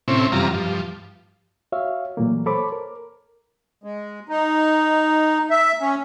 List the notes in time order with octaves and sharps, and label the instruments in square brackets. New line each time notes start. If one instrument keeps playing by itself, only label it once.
[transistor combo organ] A2 C3 C4 C#4 E4
F#2 C3 E3 G3 F4 A#5
G2 F3
[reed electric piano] F#4 C#5 E5 F5
A#2 E3 F#3 A3 A#3
A4 C5 C#5 B5 D6
A#4
[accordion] G#3
D#4
E5
C#4